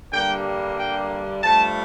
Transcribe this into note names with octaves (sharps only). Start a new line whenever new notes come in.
G2 D3 G3 A#3 G5
G5
G2 F3 A3 A5